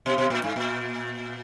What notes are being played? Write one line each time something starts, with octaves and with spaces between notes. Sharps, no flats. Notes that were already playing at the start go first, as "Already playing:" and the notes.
B2
B2
A#2
G#2
A#2